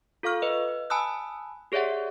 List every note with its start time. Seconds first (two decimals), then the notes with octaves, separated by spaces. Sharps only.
0.23 F4 A4 F5 C#6 F6
0.42 B4 D#5
0.90 G#5 A5 B5 D#6 E6 F#6
1.72 G4 G#4 C#5 D5 E5 F#5